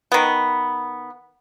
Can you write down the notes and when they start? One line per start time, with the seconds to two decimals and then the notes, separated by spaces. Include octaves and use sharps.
0.12 D#3 B3